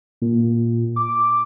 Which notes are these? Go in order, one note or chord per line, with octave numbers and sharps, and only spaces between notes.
A#2
D6